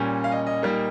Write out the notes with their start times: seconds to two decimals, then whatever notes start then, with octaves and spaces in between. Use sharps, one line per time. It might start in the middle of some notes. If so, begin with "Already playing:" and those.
Already playing: A#2 G3 C#4
0.24 F5
0.32 D#5
0.47 D#5
0.62 A#2 G3 A#3 D#4